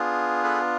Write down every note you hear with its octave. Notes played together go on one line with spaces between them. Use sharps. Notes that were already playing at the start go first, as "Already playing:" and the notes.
Already playing: B3 D4 F4 G#4
A4 B4